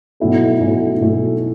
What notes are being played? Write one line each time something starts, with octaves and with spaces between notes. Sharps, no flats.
B1 B2 A3 E4 A4
B1 B2 A3 E4 A4
B1 B2 A3 E4 A4